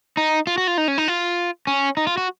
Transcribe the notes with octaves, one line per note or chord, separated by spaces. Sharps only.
D#4
F4
F#4
F4
D#4
C#4
D#4
F4
C#4
D#4
F4
F#4